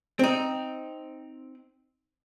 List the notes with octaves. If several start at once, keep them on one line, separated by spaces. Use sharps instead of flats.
C4 D#4